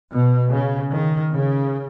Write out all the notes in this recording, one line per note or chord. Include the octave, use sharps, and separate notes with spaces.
B2
C#3
D#3
C#3